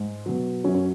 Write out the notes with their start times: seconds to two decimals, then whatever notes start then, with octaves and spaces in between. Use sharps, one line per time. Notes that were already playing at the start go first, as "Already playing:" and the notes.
Already playing: G#2
0.26 B2 F#3
0.64 F#3 C#4
0.68 F#2
0.75 C#4